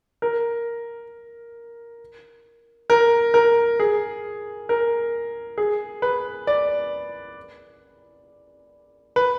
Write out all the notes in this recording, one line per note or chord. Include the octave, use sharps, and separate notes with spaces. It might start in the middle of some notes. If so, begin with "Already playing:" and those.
A#4
A#4
A#4
G#4
A#4
G#4
B4
D5
B4